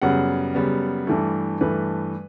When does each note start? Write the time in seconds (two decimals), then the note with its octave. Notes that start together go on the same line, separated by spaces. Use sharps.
0.02 F#2 C#3 G3 B3 F#5
0.54 F#2 C#3 G3 B3
1.07 G2 E3 A3
1.61 G2 E3 A3 B4